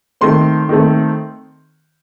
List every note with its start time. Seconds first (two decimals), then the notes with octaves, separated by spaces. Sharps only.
0.21 D#3 A3 C4 C6
0.69 D#3 A3 C4